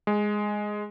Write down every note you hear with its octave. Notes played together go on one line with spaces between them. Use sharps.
G#3